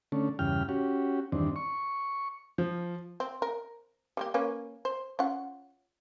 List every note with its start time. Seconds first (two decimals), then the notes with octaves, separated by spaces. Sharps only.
0.12 D3 A3 C#4
0.39 E2 G2 C#3 G5 F6
0.69 C#4 F#4 G4
1.32 E2 G2 D#3 C4 D4
1.56 C#6
2.58 F3
3.20 C4
3.42 A#4
4.17 G3 A#3 G4
4.34 A#3 C#4 B4
4.85 C5
5.19 C#4 F4 F#5